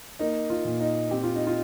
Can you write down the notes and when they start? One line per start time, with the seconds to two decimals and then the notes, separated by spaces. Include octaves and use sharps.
0.19 A#3 D#4
0.50 F4
0.65 A#2
0.81 D#4
1.11 C4 G4
1.24 F4
1.36 D#4
1.47 F4